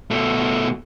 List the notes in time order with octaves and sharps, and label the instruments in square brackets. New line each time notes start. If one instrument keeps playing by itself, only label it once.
[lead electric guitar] B2 A3